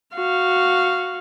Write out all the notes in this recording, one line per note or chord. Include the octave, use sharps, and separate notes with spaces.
F#4 F5